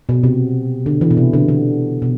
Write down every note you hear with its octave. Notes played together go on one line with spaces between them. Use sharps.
B2
C3
D3
E3
B2
C3
D3
D3
B2